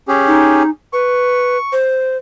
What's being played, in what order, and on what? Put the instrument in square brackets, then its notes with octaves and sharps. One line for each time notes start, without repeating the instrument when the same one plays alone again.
[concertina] C#4 G4 G#4
[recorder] D#4
[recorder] B4 [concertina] C#6
[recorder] C5